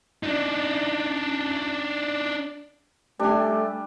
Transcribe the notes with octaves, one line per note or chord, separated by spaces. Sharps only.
D4 D#4
G3 A3 D4 G4 G#5